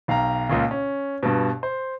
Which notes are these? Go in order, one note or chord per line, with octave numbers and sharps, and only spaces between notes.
B1 F5 G5 A#5
C#2 A#2 C#3
C#4
G2 B2
C5